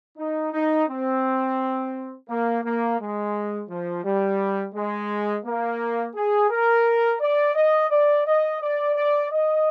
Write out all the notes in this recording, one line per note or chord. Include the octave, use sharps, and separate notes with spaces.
D#4
D#4
C4
A#3
A#3
G#3
F3
G3
G#3
A#3
G#4
A#4
D5
D#5
D5
D#5
D5
D5
D#5